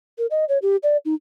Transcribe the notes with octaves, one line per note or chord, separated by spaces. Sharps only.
A#4
D#5
C#5
G4
D5
D#4